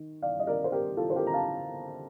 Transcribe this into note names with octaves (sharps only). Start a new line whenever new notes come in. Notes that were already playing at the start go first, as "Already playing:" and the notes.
Already playing: D#3
D5 F5
D#5
A#4 D5
C5
G4 A#4
F4 A4
C5
G4 A#4
A#5
F5 A5